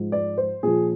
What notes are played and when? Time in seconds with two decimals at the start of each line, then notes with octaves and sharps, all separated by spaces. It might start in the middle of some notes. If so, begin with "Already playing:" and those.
Already playing: G#2 F3
0.12 D5
0.38 C5
0.63 A#2 F3 G#4